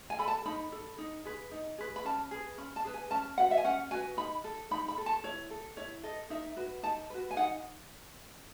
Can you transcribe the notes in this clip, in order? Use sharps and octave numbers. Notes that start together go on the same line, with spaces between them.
G#5
A4 B5
A5
D#4 B5
A4
D#4
G#4 B4
D#4
G#4 B4
B5
C#4 A5
G#4 B4
C#4 B5
A5
G#4 B4
G#5
C#4 A5
F#4 B4 F#5
E5
G#5
C#4 F#5
F#4 B4 G#5
D#4 B5
A4
D#4 B5
B5
A4
A5
E4 C#5
A4
E4 C#5
A4 D#5
D#4 E5
F#4 B4
D#4 A5
F#4 B4
G#5
D#4 F#5